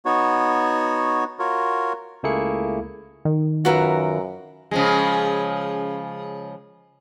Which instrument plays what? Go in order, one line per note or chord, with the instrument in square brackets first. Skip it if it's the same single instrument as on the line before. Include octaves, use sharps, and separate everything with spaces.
[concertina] B3 D#4 F#4 C#5
F4 F#4 A#4 C#5
[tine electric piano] C#2 A3 A#3 E4 G#4 C#7
[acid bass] D#3
[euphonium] F#2 [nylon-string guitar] F4 B4 F5 [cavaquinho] F#4 A#4 E5
[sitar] C#3 F3 G#3